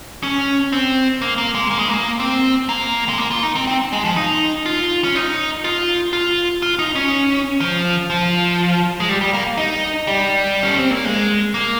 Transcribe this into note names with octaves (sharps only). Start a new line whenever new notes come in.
C#4
C4
A#3
A#3
G#3
A#3
G#3
A#3
C4
A#3
G#3
A#3
F4
D#4
C4
C4
G#3
F3
D#4
F4
C#4
D#4
F4
F4
F4
D#4
C#4
F3
F3
G#3
G3
G3
A#3
D#4
G3
C#4
C4
A#3
G#3
A#3